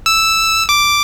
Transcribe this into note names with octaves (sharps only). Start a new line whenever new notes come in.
E6
D6